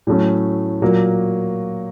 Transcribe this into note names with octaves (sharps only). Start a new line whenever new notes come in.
A2 F#3 A3 C#4
A#2 F#3 A#3